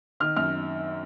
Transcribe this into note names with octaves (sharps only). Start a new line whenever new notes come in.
D#3 F6
F#2 F6